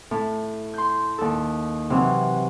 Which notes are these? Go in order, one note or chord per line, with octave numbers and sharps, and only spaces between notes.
A2
C6 G6
D#2 A4
C3 E3 F#3